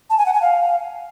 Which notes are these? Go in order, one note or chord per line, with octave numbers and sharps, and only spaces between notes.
A5
G#5
F#5
G#5
F5